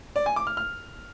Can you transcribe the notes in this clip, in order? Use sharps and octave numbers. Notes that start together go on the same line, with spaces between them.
D5
G#5
D6
F6
F6